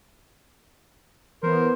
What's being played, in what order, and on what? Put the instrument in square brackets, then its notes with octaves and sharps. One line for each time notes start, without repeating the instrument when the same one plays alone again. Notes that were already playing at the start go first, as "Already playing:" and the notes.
[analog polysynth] E3 B3 [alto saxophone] A#4 [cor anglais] C5